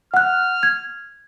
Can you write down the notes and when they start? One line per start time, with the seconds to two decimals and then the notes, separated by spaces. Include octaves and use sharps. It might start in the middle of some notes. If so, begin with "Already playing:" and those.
0.14 F#5 F6 F#6
0.63 G#6